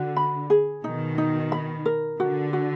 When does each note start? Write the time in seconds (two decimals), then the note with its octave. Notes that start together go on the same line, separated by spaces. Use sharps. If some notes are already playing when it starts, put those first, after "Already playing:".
Already playing: D3 F#4
0.16 B5
0.50 G#4
0.84 B2 D#3 D#4
1.18 D#4
1.52 B5
1.85 A#4
2.20 D3 F#4
2.53 F#4